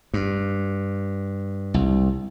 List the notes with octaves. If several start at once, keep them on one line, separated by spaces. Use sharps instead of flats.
G2
C2